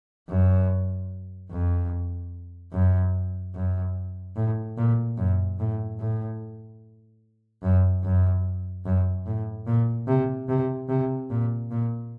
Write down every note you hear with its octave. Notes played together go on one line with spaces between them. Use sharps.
F#2
F2
F#2
F#2
A2
A#2
F#2
A2
A2
F#2
F#2
F#2
A2
A#2
C3
C3
C3
A#2
A#2